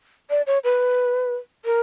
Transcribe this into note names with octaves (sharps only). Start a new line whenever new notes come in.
D5
C#5
B4
A#4